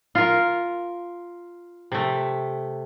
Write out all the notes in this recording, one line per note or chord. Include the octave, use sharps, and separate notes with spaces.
F4 A#4
C3 A3